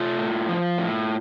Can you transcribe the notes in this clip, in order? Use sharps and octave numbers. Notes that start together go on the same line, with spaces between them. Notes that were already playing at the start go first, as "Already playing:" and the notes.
Already playing: A3 F4
A2
F3
A2